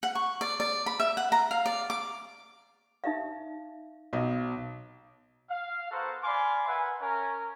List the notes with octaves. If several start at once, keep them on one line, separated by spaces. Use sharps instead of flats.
F#5
C#6
D5
D5
B5
E5
F#5
A#5
F5
D5
D6
D#4 E5 F5
B1 D#5
F5
B3 F#4 A4 A#4 C5 F#5
D5 F5 G#5 B5 C6 D6
A#4 B4 E5 F#5 G#5
C#4 A#4